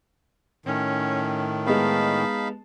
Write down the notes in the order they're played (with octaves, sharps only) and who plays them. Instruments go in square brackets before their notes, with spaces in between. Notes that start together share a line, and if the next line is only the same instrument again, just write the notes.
[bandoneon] A2 D#3 [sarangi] C#4
[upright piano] G#3 B3 [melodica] D#4 F5 B5 [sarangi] A5